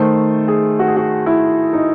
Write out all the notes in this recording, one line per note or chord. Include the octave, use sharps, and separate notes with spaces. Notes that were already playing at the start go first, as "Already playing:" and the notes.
Already playing: D#3 A3 C5
G#4
F#4
G#4
F#4
E4
D#4